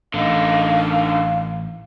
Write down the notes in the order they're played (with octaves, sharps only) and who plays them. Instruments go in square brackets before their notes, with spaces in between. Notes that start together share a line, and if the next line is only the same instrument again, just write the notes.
[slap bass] A1 [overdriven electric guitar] D3 D#4 [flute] F5